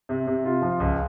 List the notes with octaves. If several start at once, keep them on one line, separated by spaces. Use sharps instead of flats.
C3
C3
F4
F3
C#2